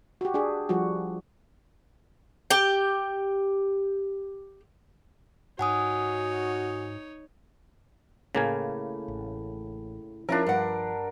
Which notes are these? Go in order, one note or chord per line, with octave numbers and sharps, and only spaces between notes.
F#4 G4
D4 G#4
F3 G3 F#4
G4 G5
G#2 D#4 F#4 C#5 F#5 G#5 D#6
A2 C#3 A#3 G#5
A1
F3 C#4 D4 E4 F4 A#4
G2 F#5